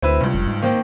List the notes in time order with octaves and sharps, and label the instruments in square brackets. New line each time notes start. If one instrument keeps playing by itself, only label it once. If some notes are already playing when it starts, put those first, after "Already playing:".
[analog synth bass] D2 [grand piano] C4 E4 B4
[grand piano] C#2 G2 [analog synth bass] C3
[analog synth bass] F1
G#2
[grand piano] D#3 A#3 C4